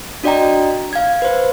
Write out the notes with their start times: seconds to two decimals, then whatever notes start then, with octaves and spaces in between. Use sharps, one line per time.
0.24 D4 F#4 D5 D#5 G5 A#5
0.93 F5 G#6
1.22 B4 C5